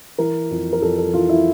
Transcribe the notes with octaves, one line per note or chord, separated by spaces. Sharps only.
E3 A#4
F2
A#4
F2 A4
A4
E3 F4
E4